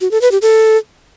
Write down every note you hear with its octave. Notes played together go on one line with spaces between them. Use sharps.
F#4
A4
B4
G4
A4